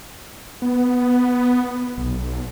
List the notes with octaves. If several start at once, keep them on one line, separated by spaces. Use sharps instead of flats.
B3
B1